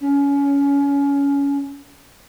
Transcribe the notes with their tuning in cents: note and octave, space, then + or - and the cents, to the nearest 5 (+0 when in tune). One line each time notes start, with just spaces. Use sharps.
C#4 +20